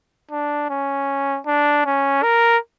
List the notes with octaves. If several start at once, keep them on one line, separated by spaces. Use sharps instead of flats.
D4
C#4
D4
C#4
A#4